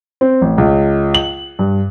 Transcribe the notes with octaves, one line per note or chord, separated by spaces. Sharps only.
C4
A1
C#2
F#7
G2